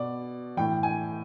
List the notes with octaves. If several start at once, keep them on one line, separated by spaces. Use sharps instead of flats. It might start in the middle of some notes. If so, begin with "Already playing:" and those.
Already playing: B2 D5
A2 E3 G5
G#5